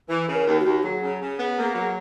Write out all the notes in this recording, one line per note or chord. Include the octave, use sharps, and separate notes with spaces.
E3 B4
C#3
A#4
D#2
F#4
D#2
F#3 G#4
C#3
C#3
B3
A#3
F#3